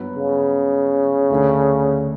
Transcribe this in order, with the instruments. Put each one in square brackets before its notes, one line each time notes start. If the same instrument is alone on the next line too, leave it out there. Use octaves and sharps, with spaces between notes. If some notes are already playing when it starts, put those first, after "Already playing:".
Already playing: [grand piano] G2 F#3 B3
[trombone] C#3
[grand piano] D2 D3 A3